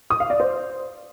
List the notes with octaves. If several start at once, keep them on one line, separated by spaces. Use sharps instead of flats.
D#6
F5
D5
C5